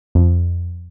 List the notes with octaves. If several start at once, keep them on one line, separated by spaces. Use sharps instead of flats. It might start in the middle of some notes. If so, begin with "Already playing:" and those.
F2